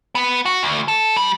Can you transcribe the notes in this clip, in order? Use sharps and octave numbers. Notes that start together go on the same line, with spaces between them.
B3
F#4
D2
A4
G3